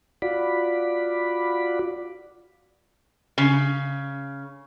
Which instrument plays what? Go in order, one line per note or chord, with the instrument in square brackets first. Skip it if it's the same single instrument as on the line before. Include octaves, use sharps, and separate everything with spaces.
[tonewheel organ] F4 F#4 D5 B5
[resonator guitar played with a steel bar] C#3